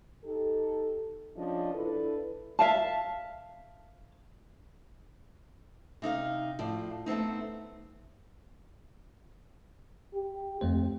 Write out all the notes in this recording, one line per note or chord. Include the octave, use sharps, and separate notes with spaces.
D#4 G4 A4
C#3 F3 D4 D#5
D4 E4 A4 B4
E5 F5 A5
C3 D#4 D5 F5
A2 F3 D5
A3 B3 C4 D#4
G4
F2 A3 C4 C5